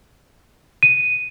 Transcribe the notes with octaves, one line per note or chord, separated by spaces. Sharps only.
D#7